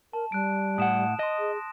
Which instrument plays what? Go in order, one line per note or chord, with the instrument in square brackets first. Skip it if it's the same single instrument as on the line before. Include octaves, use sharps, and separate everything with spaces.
[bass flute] A#4 [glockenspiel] A5
[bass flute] G3 [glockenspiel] A5 F#6 D7
[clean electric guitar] A2 F#5 [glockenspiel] D#6 E7
[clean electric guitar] D#5 [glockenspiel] C6 D#6 A#6
[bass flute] G#4